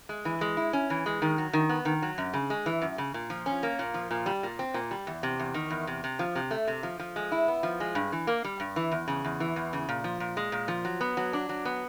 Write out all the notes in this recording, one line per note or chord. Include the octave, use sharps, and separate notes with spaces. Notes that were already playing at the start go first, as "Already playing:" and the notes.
G#3
E3
G#3
E4
C#4
E3
G#3
D#3
F#3
D#3
B3
D#3
F#3
F#2
C#3
G#3
E3
F#2
C#3
A#2
F3
C#4
A#3
A#2
F3
A#2
G3
A#2
C4
A#2
G3
E2
C3
E2
D#3
E2
C3
C3
F3
C3
A3
C3
F3
F3
G#3
E4
B3
F3
G#3
G2
E3
A#3
G3
G2
E3
E2
C#3
E2
E3
E2
C#3
A#2
F3
A#2
G#3
A#2
F3
F#3
B3
F#3
D4
F#3
B3